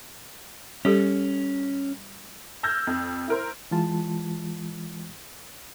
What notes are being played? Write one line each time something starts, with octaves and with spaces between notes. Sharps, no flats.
G3 C#4 G4 A4
E6 F6 G6 G#6 A#6
F2
E4 A#4 C5
E3 G#3 F4 A5